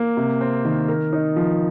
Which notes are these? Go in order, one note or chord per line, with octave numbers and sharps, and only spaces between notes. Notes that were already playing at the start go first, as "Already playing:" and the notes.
Already playing: A#3
C3
C4
D#3
A#4
D#4
F3